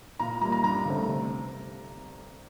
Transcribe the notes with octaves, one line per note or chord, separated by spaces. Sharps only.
A#2 A#5
G3 A#3 A#5
A#5
G2 A#5
D3 A3 C4
C3